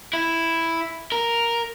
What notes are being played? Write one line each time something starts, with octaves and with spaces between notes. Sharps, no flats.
E4
A#4